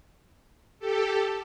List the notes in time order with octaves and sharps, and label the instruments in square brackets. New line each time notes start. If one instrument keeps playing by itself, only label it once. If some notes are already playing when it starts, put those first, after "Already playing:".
[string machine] G4 A4